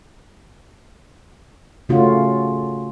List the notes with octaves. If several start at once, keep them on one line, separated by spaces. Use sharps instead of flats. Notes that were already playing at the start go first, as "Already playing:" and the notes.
C#3 A3 C#4 F4 F#4